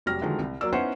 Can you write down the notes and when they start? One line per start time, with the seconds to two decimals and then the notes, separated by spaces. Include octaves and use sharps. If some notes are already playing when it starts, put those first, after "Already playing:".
0.06 F1 F#3 G3 F6 A#6
0.22 D3 D#3 F3 F#3 G#3
0.39 C2
0.61 F#3 A#3 D5 E6
0.72 B3 C#4 D#4 E4 C5 F#5